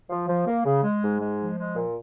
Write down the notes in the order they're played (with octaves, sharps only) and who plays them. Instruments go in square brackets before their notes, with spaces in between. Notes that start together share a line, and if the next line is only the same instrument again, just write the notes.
[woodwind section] F3
F3
A#3
C#3
G#3
G#2
G#3
F3
G#3
A#2